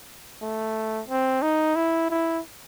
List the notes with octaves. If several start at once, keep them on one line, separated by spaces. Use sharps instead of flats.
A3
C4
D#4
E4
E4